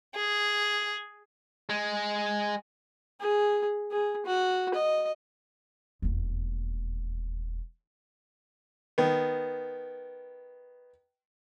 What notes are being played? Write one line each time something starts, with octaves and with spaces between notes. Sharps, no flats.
G#4
G#3
G#4
G#4
F#4
D#5
E1 D#2
D#3 B3